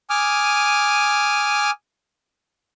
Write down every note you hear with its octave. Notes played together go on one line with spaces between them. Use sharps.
G#5 D6 D#6 F6